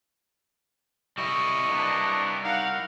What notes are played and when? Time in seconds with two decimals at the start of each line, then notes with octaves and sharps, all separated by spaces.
1.18 G3 E4 D#5 C#6
1.69 A#3 B3 D4
2.44 D#4 A#4 F5 F#5